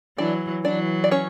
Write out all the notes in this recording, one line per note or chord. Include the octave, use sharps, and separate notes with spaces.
E3 F#3 D4 D5
E3 F#3 D4 D5
D5
C#4 C#5